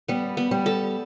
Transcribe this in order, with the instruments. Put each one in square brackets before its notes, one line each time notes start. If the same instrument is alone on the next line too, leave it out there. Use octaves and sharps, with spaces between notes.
[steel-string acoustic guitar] G3 [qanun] B3
[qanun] B3
[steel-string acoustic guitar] G3
[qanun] A4